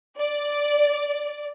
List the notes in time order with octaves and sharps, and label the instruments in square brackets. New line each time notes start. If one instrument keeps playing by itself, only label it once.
[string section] D5